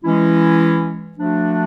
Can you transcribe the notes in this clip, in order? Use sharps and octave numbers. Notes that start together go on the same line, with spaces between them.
E3 G#3 C#4 E4
F3 A3 D4 F#4